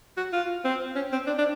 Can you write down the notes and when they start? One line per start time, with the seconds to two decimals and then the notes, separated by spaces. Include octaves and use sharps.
0.17 F#4
0.33 F4
0.64 C4
0.95 C#4
1.12 C4
1.27 D4
1.38 D4